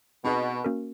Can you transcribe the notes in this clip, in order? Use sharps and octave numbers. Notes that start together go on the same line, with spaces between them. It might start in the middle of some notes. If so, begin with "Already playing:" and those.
B2 C4 D#4 G#4 B4 D#5
A#3 C#4 F#4 A#4